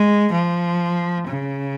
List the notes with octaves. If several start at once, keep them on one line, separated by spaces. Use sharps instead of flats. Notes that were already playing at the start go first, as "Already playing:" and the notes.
Already playing: G#3
F3
C#3